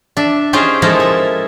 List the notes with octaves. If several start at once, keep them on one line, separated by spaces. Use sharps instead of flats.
D4 E5
C#4 D#4 F4 G4 G#4 C5
F3 G#3 D#4 E4 A4 A#4
E5